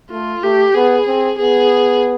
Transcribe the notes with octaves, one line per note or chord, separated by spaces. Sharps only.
A3 F4
A3 G4
B3 G#4
C4
B3 G#4